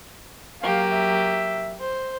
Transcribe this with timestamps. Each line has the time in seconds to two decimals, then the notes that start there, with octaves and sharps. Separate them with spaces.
0.61 F#3 A#3 G4 F5
0.91 E5
1.79 C5